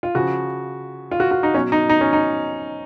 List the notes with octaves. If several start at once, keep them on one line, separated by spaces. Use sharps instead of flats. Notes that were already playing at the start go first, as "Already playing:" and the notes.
F4
C#3 F3 F#4
F4
F#4
F#4
D#4
B2 F#3 C#4
D#4
D#4
C#4
D#4